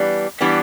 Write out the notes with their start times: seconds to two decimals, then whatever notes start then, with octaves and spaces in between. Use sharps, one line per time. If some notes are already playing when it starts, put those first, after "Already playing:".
Already playing: E3 G3 B3 D4
0.41 E3 G3 B3 D4